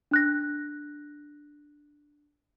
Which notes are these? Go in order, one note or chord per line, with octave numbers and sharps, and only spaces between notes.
D4 F#6 A#6